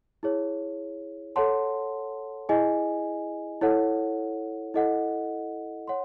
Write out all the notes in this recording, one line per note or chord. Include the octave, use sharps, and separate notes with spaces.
E4 G#4 C#5
A4 C#5 F#5 A5 C6
E4 G#4 D#5 G#5
E4 A4 C#5 F#5
E4 A4 D#5 F#5
C#5 F#5 C6